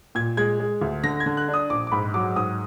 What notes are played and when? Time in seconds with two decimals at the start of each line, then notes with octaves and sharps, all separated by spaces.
0.15 A#2 G#6
0.37 G#3 G#6
0.59 G#3
0.81 D2
1.04 D3 A#6
1.20 G#6
1.26 D3
1.37 F#6
1.48 D4
1.54 D#6
1.70 A#1 D6
1.87 D6
1.92 G#2 B5
2.14 F#3 D6
2.36 G#2 D#6